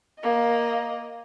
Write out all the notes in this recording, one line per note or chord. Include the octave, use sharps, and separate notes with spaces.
A#3 D#5